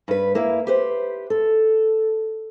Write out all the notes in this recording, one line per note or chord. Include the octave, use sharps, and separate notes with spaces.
G2 B4
A#3 E4 F5
G4 B4 C5
A4